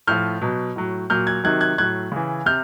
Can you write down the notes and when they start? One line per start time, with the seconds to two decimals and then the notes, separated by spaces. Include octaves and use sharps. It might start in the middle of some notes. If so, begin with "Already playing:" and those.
0.07 A2 F3 F6 G6
0.42 B2 F#3
0.76 A2 F#3
1.10 A#2 F#3 F6 G6
1.27 F#6 G#6
1.44 C3 D#3 F#3 F#6 G#6
1.61 F#6 G#6
1.78 A2 F#3 F#6 G#6
2.12 C#3 E3
2.46 C3 F6 G6